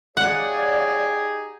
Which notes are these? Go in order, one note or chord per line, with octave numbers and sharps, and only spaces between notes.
D#4 G4 G#4 C#5 D5 F5 F#5